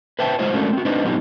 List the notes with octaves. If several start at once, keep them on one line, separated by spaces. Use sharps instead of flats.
B4 C5 E5 G5 A5
F#3 G#3 E4 F4 C5 D#5
G#3 A3 C#4 D4 F#4 A#4
C4 F#4
C4 D4 D#4 B4 C5 D#5
F#3 B3 C4 D#4 E4 G4